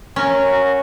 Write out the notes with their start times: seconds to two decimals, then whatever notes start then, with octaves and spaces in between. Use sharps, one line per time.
0.16 C#4 A#4
0.46 F#4